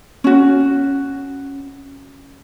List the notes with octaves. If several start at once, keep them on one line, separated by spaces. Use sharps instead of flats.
C#4 F#4